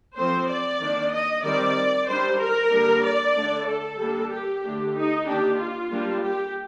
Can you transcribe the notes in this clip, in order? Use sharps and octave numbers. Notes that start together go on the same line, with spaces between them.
F3 A3 C4 C5
D5
D#3 A#3 D4
D#5
D#3 G3 C4 D5
D#3 G3 D4 C5
A#4
D3 G3 A#3 D4
D5
D3 A3 D4
A4
G3 A#3 D4
G4
D3 A3 D4
D#4
D#3 A#3 D4 G4
F4
G3 A#3 D4
G4